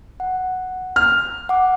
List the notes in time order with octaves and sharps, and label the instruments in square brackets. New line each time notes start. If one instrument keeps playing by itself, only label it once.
[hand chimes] F#5
[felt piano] F6
[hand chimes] F#5 D6